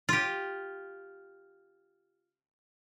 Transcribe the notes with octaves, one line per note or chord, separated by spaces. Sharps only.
F4 G4